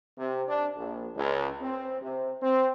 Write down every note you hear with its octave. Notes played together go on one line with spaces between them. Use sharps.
C3
D4
A#1
C#2
C4
C3
C4